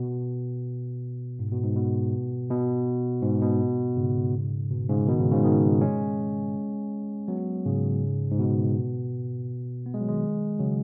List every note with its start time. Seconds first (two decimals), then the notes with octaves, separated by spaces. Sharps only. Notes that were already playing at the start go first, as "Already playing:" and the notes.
Already playing: B2
1.39 G#2
1.52 B2
1.64 G#2
1.76 B2
2.50 B2
3.23 G#2
3.42 B2
3.96 G#2 C#3
4.71 B2
4.89 G#2 C#3
5.07 B2 D#3
5.20 G#2 C#3
5.32 G#2 C#3
5.44 B2 D#3
5.81 G#3 C#4
7.28 F#3 B3
7.65 G#2 C#3
8.31 G#2
8.39 B2
9.86 B3
9.94 G#3
10.01 F#3
10.08 D#3 G#3
10.59 C#3 F#3